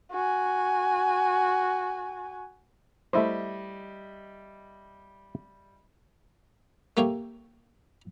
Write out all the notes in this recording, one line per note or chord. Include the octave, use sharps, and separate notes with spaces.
F#4 G#5
G3 A3 E4 C5 D#5 E5
A3 A#3 G4 C#5 F5 G5